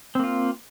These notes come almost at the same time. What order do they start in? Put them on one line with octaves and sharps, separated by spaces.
C4 A#3 F4